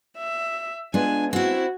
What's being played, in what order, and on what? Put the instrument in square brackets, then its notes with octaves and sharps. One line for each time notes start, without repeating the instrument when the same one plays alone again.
[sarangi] E5
[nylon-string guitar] G#3 B3 F4 [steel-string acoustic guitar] D4 [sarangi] G#5
[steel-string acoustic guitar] C4 E4 [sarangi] F#4